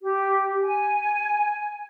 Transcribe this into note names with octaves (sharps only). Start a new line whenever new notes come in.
G4
G#5